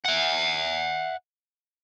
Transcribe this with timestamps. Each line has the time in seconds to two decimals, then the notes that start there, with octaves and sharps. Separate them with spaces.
0.05 E5 F#5